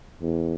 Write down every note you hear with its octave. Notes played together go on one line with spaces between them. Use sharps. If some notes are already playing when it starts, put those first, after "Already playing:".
E2